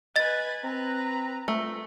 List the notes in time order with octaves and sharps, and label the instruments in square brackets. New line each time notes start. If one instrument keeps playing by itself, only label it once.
[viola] B4 G#5 [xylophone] D#5 A6
[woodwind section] C4 A#5 [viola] B4
[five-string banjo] A3 [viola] F4